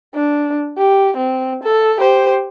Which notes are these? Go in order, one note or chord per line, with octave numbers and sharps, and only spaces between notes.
D4
G4
C4
A4
G4 C5